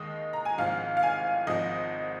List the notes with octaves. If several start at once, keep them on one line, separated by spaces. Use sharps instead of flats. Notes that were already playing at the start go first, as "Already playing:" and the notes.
Already playing: D#2 D#3 G#3 D#5
A#5
G#5
G#1 G#2 F3 F5
F5
G#5
G#1 G#2 F3 D#5